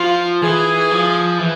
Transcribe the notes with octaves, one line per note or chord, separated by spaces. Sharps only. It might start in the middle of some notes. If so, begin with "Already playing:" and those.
Already playing: F3 F4
E3 G#4
F3
E3